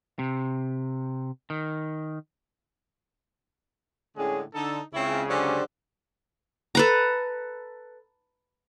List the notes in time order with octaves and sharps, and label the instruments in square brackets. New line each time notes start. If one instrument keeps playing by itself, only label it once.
[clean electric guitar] C3
D#3
[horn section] A2 D3 G#3 [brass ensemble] C#4 G#4
[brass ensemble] D3 [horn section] D#4 A4
[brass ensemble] C#2 C#3 [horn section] C4 E4 C#5
[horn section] D3 F#3 C#4 [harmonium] G4 C5 D5
[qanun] A4 B4 A#5